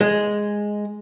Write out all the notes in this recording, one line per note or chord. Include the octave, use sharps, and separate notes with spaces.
G#3